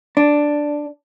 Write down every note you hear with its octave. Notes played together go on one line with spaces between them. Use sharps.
D4